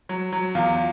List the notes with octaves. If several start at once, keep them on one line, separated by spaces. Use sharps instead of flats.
F#3
F#3
E2 F4